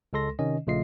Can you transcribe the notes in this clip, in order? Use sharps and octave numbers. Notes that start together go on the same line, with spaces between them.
C#2 G#3 A4 C6 A#6
C3 D#3 C#4 D#5
A#1 C#3 A3 F4 D#5 C7